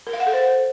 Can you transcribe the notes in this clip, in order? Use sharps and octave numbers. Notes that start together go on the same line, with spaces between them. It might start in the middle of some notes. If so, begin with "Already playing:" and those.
A#4
F5
F#5
A4
C5